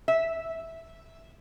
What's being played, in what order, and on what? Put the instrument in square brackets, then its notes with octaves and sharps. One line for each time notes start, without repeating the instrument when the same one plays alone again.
[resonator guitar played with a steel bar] E5